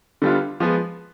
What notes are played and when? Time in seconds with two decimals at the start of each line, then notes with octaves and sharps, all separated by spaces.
0.22 D3 G3 B3 F4
0.60 F3 G#3 B3